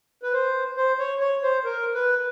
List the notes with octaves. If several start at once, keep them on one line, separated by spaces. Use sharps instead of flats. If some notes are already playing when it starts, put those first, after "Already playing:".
B4
C5
C5
C#5
C#5
C5
A#4
B4